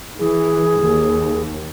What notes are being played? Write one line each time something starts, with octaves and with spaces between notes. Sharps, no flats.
E3 G#4
D#2